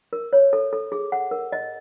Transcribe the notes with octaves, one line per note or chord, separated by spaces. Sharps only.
A#4
C#5
A4
A4
G#4
F#5
A#4
D#5